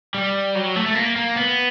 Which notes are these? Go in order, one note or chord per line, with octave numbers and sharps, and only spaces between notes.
G3
F#3
A3
A3
A#3
A#3
B3